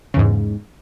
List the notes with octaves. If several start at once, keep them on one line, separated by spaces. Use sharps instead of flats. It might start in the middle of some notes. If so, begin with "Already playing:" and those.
E2 G#2 C#3